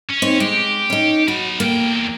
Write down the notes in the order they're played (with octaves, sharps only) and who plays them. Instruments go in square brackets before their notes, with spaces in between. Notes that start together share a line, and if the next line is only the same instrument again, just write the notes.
[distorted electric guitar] C#4
[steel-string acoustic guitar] C4 D#4 C#5
[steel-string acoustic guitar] G#3 [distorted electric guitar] G4
[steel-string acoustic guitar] C#4 D#4
[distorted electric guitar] F#3 B5 [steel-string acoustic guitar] F#4
[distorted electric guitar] E2 G5 [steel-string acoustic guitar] A#3